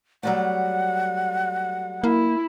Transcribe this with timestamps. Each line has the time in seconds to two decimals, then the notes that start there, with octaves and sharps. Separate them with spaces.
0.23 F#3 G3 A3 F#5
2.04 A#3 E4